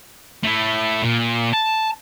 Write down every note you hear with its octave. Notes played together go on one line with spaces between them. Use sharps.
A3 E4
A#2
A5